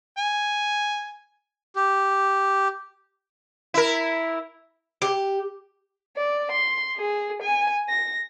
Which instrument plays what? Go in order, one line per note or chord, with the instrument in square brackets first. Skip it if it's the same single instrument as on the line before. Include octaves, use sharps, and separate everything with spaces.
[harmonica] G#5
[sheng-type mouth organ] G4
[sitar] E4 A#4
[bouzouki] G4
[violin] D5
C6
G#4
G#5
A#6